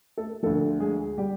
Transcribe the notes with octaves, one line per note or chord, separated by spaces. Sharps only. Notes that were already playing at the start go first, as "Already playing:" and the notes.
A3 A4
D2 D3 F3 A3 A4
G#3 G#4
G3 G4